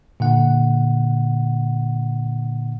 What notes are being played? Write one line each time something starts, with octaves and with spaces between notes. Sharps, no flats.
A#2 D3 F#5